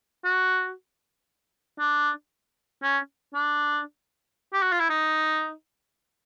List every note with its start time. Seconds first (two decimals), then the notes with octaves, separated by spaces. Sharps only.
0.25 F#4
1.79 D4
2.83 C#4
3.34 D4
4.53 G4
4.62 F#4
4.72 F4
4.80 E4
4.89 D#4